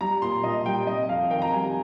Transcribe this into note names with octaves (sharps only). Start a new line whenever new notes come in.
G3 A#5
A#2 C6
A#2 D#5
G3 G5
C3 D#5
F2 F5
D#3 G5
A#5
G3 G#5